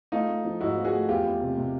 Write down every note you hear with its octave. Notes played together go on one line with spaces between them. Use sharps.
A3 D#4 F4
A3
F3
G#2 E4 F#4
F3
F#4 G#4
A3
E2 F4 G4
E2
C3
C3